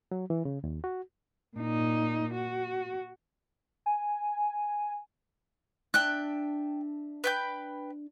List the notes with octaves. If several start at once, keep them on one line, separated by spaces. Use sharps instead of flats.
F#3
E3
C#3
D#2
F#4
A#2 D#4
F#4
G#5
D4 E5 G5 A5 F#6
B4 G5 G6